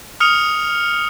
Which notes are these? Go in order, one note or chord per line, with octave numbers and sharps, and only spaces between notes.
D#6 F6 C#7 F7